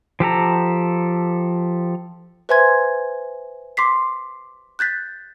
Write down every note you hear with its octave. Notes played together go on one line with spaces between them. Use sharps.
F3 G4 A4 A#5
B4 C5 E5 G#5 C6 G#6
C6 D6 B6 C7
F#6 G6 A6 B6